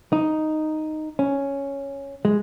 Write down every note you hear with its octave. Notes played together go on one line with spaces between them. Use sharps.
D#4
C#4
G#3